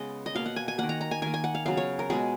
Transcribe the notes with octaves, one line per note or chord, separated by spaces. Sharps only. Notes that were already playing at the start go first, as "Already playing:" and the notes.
Already playing: C#3 G#3 B3 D#5
D#5
B2 A#3 F5
F#5
G#5
G#5
D#3 A#3 F#5
A#5
A#5
G#5
D#3 A#3 G#5
G#5
F#5
F5
C#3 F#3 B3 F5
C#5
A#4
B2 G#3 B3 G#4